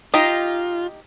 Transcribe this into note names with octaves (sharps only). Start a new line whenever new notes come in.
D#4 F4 G4 D#5